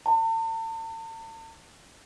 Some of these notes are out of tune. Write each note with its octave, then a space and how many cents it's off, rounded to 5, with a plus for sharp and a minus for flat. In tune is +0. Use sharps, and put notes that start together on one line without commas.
A5 +40